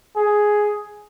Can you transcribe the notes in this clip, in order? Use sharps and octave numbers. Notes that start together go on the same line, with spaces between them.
G#4